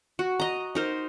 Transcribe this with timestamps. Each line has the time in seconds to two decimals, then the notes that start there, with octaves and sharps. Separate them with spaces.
0.19 F#4
0.40 D#5 A#5
0.75 D#4 A#4 C5